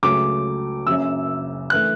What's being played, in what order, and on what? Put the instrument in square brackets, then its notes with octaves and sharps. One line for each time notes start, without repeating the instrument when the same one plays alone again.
[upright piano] C#2 C#3 F#3 A3 D6
F#1 F#2 C#3 E6
E3 A3 F#6